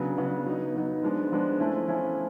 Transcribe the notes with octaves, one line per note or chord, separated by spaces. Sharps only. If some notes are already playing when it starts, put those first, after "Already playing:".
Already playing: C#3 F#3 B3 D4
C#3 F#3 B3 D4
F#3 B3 D#4
F#3 B3 D#4
F3 G#3 B3 D4
F3 G#3 B3 D4
F3 A3 C#4 E4
F3 A3 C#4 E4